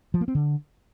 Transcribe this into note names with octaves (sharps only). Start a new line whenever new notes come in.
F3
A#3
C4
D3